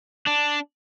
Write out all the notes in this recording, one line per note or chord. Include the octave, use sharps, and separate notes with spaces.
D4